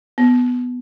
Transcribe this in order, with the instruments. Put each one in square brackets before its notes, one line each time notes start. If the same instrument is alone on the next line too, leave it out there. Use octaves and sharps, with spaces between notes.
[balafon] B3